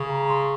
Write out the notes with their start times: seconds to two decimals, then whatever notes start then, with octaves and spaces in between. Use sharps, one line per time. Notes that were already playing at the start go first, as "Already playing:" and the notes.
Already playing: C#3
0.10 A#5
0.29 C6